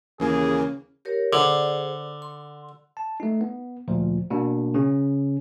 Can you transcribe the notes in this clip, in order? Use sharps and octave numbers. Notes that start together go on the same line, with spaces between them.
D#2 C#3 E3 A#3 G#4
G4 A#4 C#5
D3 G#4 C5 D5
C6
A5
A3 D#4
B3
D2 A#2 F3
B2 A#3 D4
C#3 C#4